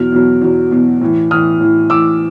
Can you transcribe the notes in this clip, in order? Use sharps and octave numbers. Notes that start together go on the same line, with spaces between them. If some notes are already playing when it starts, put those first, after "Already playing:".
Already playing: E2 B2 F#3 F6
E2 B2 F#3
E2 B2 F#3
E2 B2 F#3
A2 E3
A2 E3 D#6 F6
A2 E3
A2 E3 D6 E6